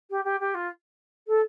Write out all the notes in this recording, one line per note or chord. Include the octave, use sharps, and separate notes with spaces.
G4
G4
G4
F4
A4